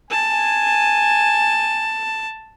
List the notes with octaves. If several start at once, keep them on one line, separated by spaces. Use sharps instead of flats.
G#5 A5